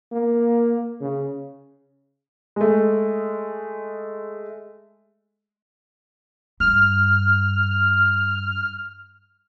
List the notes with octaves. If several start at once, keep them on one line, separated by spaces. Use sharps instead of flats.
A#3
C#3
G#3 A3
G2 F6